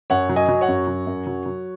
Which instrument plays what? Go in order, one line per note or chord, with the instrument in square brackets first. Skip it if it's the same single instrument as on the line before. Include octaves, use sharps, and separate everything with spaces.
[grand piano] F#2 C#5 F#5
F#3
D#5 G#5
F#3
C#5 F#5
F#2
F#3
F#2
F#3
F#3